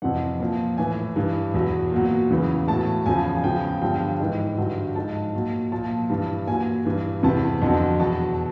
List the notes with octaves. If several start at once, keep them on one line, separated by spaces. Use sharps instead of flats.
F2 C3 E3 F#5
A#2 F3
A2 E3 G#5
G2 E3
E2 B2 F#3
A#2 F#3
E2 C#3 E3
A2 F#3 A5
E2 C#3 F3 G#5
G#5
E2 C#3 F3 G5
G2 D3 F3 G5
G#2 E3
G2 D3 F#3
G#2 F3 A5
A#2 F#3
A#2 F3 A5
G2 E3
A#2 F#3 G#5
G2 E3
E2 C3 E3 A5
F2 D3 F#3
E2 B2 F#3 A5